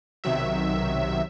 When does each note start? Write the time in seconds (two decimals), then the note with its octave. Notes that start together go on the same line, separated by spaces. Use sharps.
0.24 B1 C3 D#3 F#3 E5